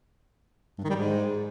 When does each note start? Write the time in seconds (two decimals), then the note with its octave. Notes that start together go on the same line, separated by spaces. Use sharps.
0.78 G2
0.84 D#3
0.90 G3
0.96 G#2